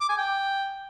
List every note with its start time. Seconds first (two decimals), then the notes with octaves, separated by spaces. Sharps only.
0.01 D6
0.09 G#5
0.18 G5